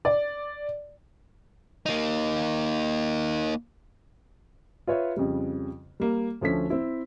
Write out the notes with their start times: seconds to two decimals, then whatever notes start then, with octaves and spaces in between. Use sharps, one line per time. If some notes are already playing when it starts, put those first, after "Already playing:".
0.05 D5
1.86 A#3 D#4
4.87 F4 B4 C#5 E5
5.16 F2 C#3 G3
6.00 G3 A#3
6.41 D2 F3 C#4 A4 B6
6.70 C4 E4